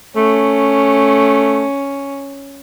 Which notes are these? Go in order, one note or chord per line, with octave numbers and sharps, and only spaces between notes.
A3 C#4